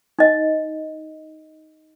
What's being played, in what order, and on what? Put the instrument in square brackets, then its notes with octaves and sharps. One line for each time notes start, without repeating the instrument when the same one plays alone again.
[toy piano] D#4 D#5